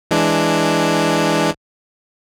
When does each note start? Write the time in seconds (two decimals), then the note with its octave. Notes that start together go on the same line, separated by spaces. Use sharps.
0.11 E3 G#3 D4